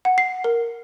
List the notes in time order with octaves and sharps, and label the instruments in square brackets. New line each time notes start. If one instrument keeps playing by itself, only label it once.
[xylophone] F#5
C7
A#4